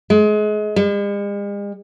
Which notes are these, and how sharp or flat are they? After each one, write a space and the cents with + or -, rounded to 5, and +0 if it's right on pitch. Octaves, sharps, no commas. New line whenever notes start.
G#3 +30
G#3 -45